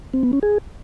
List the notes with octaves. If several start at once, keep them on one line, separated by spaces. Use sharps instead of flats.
C4
B3
C#4
G#4